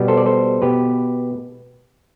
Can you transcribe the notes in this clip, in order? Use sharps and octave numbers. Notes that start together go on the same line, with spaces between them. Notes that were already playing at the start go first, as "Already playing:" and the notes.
Already playing: B2 G3 B3
A4 C5
D5
A4 C5
B2 B3 G4 B4